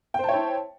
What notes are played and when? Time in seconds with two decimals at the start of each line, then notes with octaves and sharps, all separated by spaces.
0.14 G5
0.19 C5
0.24 A5
0.29 C#5
0.33 E4